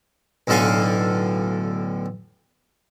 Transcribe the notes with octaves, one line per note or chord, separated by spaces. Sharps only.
B1 A2 D3 A4 F5 G#5